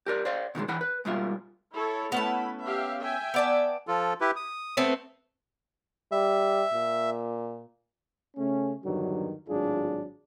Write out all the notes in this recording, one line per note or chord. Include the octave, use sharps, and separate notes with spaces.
G4 A#4 D5
C5 D5 F5
B2 D#3 G3 G#3
E3 E4 F#5 G5 B5
B4
G#2 B2 G3 A#3 F4 E5
E4 A4 C#5
A3 B3 C#4 E4 A5 B5
G4 E5 F5
E5 G5 G#5
B3 D5 A5
F3 F4 A4
E4 G4 B4
D#6
A3 B3 C4
G3 E5
A#2
C#3 A3 C#4
E2 G2 D3 D#3 F#3
G#1 A2 F#3 D4 F4 G#4